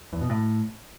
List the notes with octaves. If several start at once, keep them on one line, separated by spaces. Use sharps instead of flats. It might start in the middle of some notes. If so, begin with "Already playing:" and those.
E2
B2
A2